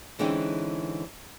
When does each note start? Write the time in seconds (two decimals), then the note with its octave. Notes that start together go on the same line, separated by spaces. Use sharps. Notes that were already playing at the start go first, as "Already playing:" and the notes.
0.19 D3 E3 G#3 C4 C#4 D#4